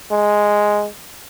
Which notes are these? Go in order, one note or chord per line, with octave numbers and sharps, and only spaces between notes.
G#3